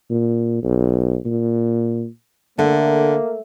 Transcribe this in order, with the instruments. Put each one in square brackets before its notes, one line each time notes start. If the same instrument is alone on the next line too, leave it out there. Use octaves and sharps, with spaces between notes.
[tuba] A#2
B1
A#2
[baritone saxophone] D3 [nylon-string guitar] A3 [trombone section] A#3